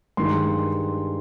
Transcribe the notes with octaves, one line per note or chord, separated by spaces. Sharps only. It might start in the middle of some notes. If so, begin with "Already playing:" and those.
G2 D#3 G#3 C6